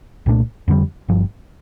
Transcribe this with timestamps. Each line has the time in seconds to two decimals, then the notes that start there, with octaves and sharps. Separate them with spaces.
0.26 C2 A#2 A3 D4
0.68 F2 D3 G3
1.08 G1 G2 F3